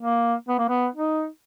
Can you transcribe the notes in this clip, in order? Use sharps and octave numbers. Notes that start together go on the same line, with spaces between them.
A#3
B3
A#3
B3
D#4